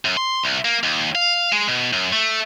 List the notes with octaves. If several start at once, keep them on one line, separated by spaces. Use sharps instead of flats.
F#2
C6
C2
A#3
D#2
F5
G#3
B2
F#2
A3